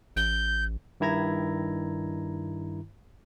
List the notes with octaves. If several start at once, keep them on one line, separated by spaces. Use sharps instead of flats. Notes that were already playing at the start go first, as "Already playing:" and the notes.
A1 G6
G2 D#3 E4 A#5 G#6 A#6